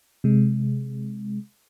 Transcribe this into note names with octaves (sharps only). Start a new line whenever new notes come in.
C3 G#3